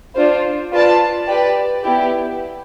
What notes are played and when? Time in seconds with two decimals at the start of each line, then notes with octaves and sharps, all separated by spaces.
0.16 D4 F4 C5
0.72 F4 B4 D5 A5
1.28 G4 B4 D5
1.84 B3 E4 G4